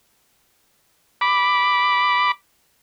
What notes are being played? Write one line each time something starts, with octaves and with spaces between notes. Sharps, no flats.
B5 D6